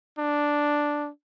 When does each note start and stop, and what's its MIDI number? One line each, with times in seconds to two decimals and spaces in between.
0.18 1.09 62